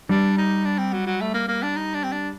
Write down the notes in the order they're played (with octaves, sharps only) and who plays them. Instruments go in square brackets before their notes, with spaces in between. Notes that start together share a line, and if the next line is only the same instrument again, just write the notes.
[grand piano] G3 [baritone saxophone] D4
[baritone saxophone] D#4
D4
C4
F#3
F#3
A3
A#3
A#3
D4
D#4
D4
C4
D4